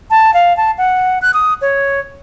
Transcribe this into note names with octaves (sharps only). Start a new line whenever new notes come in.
A5
F5
A5
F#5
F#6
D#6
C#5